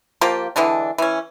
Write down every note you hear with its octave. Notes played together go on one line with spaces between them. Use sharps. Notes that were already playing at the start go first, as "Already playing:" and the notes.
F3 A#3 F4 G4
D3 E3 G#3 D4
E3 C#4